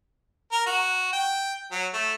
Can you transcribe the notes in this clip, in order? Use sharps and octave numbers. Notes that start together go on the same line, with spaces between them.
A#4
F#4
G5
F#3
A3